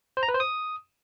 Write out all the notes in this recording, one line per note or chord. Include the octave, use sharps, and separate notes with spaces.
C5
A#5
B4
C5
D#6